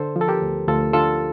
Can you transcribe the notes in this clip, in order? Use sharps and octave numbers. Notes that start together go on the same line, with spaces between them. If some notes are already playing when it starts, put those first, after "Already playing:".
Already playing: D3 A4 C5
F3
A4
G4 A#4
D2
D2 F4 A4
D3 F4 A4